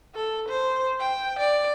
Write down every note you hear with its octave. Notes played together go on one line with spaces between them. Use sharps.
A4
C5
G5
D5